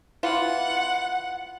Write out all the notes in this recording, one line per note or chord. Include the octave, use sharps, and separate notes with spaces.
E3 F4 F#5